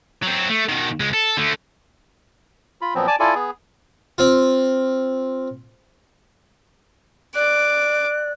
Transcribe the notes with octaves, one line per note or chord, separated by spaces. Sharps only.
F#3 C4
A3
B2 D#3
C#2 G#3
A4
D3 A3
F4 B5
A#2 F3 F#3 B3 C4
D5 G#5 A5 D6
E4 F4 A4 D5 G#5
B3 G#4
C4 F4
D5 D6 F#6